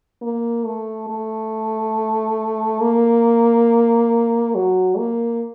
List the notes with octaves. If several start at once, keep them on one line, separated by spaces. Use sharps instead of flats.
A#3
A3
A3
A#3
F#3
A#3